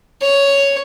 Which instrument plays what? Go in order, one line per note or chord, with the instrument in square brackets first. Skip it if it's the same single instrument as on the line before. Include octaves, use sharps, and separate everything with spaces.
[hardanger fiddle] C#5